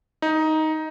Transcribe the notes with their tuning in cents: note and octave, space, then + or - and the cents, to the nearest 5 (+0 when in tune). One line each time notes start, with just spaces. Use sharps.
D#4 +10